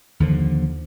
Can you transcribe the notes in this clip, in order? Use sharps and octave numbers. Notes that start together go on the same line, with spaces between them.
D#2 D3 F3